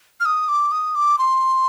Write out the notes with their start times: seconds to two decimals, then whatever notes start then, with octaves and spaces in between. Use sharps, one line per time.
0.20 F6
0.25 D#6
0.48 D6
0.71 D#6
0.95 D6
1.18 C6